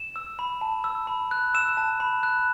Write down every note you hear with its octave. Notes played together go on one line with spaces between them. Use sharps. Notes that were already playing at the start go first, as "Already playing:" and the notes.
Already playing: E7
E6
B5
A5
E6
B5
F#6
E6 E7
A5
B5
F#6